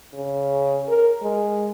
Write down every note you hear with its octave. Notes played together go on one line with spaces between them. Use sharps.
C#3
A#4
G#3